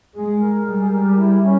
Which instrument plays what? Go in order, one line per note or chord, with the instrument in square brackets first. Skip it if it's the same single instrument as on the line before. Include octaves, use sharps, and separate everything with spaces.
[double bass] G#3 [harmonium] G#4
[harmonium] A#4
[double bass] G3 [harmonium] G#4
[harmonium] G#4
A#4
G4
E4
C#4